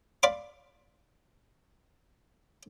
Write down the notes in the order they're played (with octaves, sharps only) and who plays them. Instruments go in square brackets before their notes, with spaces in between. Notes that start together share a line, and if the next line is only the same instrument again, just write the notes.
[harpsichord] D5 F5 B5 C6 D6